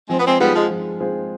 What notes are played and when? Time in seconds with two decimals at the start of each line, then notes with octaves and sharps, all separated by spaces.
0.09 F3 G#3 C4
0.18 B3
0.25 G#3 C4
0.39 G3 G#3 B3 C4 F4 G#4
0.54 F3 G#3
0.70 F3
1.00 G#3 C4 F4 G#4